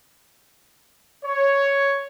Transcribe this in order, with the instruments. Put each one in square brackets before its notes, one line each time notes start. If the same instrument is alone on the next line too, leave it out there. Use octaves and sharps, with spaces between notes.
[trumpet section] C#5